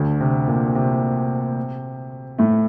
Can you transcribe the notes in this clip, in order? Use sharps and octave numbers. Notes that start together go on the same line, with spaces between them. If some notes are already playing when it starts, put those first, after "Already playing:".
Already playing: D2 D3
C3
A#2
C3
A2 A3